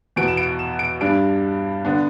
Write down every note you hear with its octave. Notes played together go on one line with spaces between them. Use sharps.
E2 B2 B3 D7
E7
D7
E7
D7
G2 G3 D4 D7
D3 B3 D4